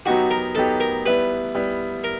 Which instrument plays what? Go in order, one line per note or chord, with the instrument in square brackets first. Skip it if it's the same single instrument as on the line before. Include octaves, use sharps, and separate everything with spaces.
[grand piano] F#3 B3 D#4 G4 [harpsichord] F#4
[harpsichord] A#4
[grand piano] F#3 B3 D#4 G4 [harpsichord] A4
[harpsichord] A#4
[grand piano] G3 B3 E4 [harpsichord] B4
[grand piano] G3 B3 E4
[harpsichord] A#4